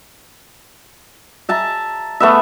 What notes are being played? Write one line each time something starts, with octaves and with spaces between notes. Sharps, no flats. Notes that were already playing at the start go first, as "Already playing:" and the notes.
E5 A5 A#5
A3 B3 E5